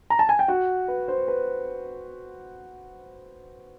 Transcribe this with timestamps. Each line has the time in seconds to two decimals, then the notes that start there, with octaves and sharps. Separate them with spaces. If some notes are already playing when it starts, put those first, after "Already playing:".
0.10 A#5
0.19 A5
0.29 G#5
0.39 G5
0.48 F#4 F#5
0.88 B4
1.08 C5
1.28 B4